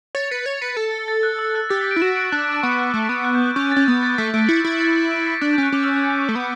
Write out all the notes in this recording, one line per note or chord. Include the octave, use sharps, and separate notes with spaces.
C#5 A6
B4 C#7
C#5
B4 C#7
A4 A6
A6
F#6
E6
F#6
G4 A6
B6
D7
E4
F#4 E7
D7
D4 F#6
F#6
D6
E6
B3 C#6
F#6
A3
B3
F#6
G6
F#6
C#4 G6
C#4 A6
B3 G6
A6
A3 B6
A3 D7
E4 C#7
E4 A6
A6
D7
D7
B6
D4 A6
G6
C#4 F#6
C#4 D6
E6
F#6
G6
F#6
A3
B3 G6